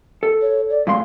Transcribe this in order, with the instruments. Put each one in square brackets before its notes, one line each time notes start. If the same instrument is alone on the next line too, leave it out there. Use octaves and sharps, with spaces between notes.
[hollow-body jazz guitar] A4
[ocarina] C#5
D5
[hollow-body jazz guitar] A2 G#3 C6 [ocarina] F5